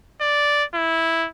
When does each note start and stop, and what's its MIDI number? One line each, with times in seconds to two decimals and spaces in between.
0.21 0.64 74
0.75 1.28 64